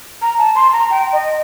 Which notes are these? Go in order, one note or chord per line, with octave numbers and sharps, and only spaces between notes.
A#5
A5
C6
A#5
G5
D#5